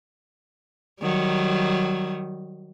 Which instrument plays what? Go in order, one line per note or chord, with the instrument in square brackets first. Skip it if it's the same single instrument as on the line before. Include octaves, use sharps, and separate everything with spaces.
[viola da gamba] D#3 F#3 G3